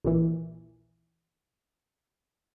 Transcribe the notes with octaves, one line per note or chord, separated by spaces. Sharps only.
A#1 D#2 A#2 E3